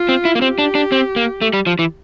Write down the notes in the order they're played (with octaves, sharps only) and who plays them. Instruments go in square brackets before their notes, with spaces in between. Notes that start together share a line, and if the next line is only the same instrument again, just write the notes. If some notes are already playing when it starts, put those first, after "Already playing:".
Already playing: [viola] F4
[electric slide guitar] C4
E4
A#3
[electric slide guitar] C4 [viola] G4
[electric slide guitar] D4
D4
C4
A#3
A3
G3
F3
E3